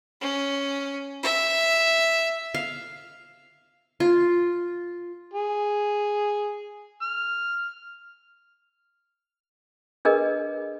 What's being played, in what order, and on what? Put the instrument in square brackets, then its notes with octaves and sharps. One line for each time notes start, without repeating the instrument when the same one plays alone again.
[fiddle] C#4
E5
[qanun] F5
F4
[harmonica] G#4
F6
[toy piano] D4 G#4 A#4 B4 D#5